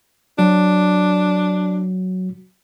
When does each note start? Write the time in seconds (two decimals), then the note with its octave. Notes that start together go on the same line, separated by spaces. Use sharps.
0.38 F#3 D4 F#4